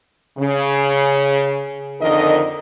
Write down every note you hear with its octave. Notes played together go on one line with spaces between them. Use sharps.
C#3
F2 D3 D#3 A#4 D#5